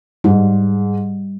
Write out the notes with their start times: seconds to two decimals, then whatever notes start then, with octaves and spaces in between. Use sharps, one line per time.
0.24 G#2 G3